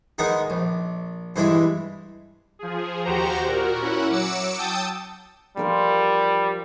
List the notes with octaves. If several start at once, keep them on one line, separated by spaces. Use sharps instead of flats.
D#3 G#3 B3 D#4
A#1
G2 E3 G#3 E4
F3 G#4
D#2 F#4 G4 C5 A#5
A#2 F#4 A#4
C#4 E4 F#4 F#5
F#3 D6 E6 C#7 E7
G5 A5 D#6 E6 G6 A6
F3 G3 A#4 C6